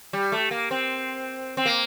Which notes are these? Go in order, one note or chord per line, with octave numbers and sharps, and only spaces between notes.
G3
A3
A#3
C4
C4
A#3